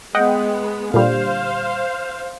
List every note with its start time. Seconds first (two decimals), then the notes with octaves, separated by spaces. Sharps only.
0.15 G#3 B3 D#5 F#5 G5
0.94 A#2 D3 G3 C5 F5